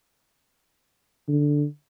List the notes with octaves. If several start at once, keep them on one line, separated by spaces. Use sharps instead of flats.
D3